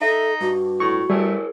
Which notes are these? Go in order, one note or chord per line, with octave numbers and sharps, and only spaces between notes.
D#4 A4 E5
G2 F#4
A2 C#6
G3 A3 G#4 A#4 C#5